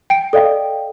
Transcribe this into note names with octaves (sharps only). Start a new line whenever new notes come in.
G5 D7
A4 D5 D#5 F5 G5